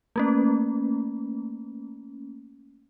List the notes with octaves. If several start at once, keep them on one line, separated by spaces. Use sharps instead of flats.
A3 A#3 C#4